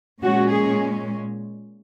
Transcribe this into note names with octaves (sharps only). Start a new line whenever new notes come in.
A#2 G#3 C#4 F#4
G#4